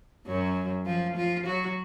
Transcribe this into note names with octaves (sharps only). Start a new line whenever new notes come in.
F#2 F#3
F3 F4
F3 F4
F#3 F#4